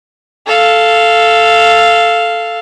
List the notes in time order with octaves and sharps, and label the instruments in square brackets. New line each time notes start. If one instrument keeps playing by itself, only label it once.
[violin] A4 F5